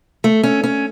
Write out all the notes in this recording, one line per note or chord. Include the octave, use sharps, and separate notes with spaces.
A3
C#4
C#4